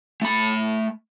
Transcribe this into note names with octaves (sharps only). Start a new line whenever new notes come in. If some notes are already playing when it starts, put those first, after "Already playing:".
A3 B5